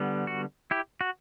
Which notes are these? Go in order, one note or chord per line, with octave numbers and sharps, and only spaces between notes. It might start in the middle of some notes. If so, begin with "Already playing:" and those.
Already playing: D3 G3 B3
F#4
E4 G4
F#4